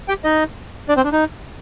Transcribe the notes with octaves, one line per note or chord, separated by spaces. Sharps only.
G4 G5
D#4 D#5
D4 D5
C4 C5
D4
D#4